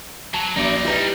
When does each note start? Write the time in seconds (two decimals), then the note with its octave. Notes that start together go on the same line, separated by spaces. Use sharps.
0.34 F#3 A5
0.56 A#1 F#2 D#4 D5
0.84 G3 E4 B4 A#5